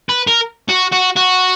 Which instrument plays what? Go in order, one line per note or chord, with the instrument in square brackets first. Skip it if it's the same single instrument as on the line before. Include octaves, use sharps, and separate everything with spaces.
[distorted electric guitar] B4
A#4
F#4
F#4
F#4